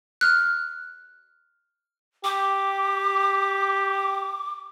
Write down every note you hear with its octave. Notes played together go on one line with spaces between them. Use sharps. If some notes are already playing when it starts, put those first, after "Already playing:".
F6 F#6
G4 D6